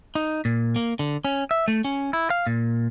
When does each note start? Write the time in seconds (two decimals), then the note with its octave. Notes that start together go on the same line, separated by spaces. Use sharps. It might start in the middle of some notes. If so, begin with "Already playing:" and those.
0.15 D#4
0.45 A#2
0.76 A#3
0.99 D3
1.25 C#4
1.51 E5
1.68 A3
1.85 C#4
2.13 E4
2.30 F5
2.47 A#2